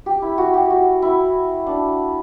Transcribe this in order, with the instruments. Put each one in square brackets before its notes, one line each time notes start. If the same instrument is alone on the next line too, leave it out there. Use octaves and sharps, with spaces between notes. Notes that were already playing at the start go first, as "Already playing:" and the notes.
[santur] G4
E4
F#4
G4
F#4
E4
D4